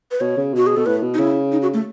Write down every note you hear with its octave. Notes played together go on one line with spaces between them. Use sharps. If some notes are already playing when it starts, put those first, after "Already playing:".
B4
B2 C#5
C#3
B2 F#4
G#4
B2 A4
A2 B4
B2
D#4
C#3 E4
D#4
F#4
A3